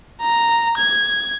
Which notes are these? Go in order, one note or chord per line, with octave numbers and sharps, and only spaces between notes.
A#5
G#6